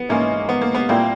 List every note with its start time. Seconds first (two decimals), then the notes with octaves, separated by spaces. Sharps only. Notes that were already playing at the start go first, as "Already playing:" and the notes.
Already playing: B3
0.09 G#2 E3 G#3 A#3 C#4
0.49 B3
0.61 A#3
0.75 B3
0.89 A#2 G3 A#3 C4 E4